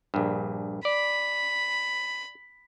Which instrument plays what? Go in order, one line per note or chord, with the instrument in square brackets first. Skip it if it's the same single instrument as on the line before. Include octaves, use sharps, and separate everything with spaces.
[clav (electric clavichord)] A#1 G2
[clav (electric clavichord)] D5 [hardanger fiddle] B5